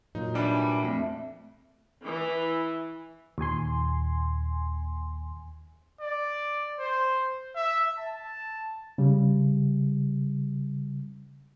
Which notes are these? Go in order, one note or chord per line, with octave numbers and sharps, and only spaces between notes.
A#2 F#3 D#4
E3 G3 D4 E5
F2 A3 C4 E5
E3
D#2 A#2 G#5 C6
D5
C5
E5
A5
C#3 G3